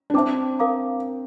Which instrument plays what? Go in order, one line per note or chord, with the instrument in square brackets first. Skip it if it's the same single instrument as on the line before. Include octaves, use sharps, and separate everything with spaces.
[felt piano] D4
[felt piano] C4 [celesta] C5 E5 A5 D6
[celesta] A#4 F5 A#5 D6